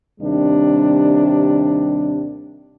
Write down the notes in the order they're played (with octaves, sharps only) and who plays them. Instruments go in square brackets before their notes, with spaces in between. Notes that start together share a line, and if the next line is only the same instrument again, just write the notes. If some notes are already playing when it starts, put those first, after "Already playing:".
[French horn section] D#2 C3 G3 D4